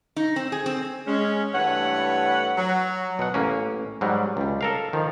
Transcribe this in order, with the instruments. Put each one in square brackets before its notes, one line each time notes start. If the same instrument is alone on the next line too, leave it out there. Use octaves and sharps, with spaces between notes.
[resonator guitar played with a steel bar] D#4
C4
G#4
C4
[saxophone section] G#3 C#4
G2 E3 A3 B4 C#5 F#5
F#3
[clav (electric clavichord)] B2 F#5
A1 A#3 C#4
G#2 F#3 G3
C#2 G3
A4 A#4 F5
D#3 F3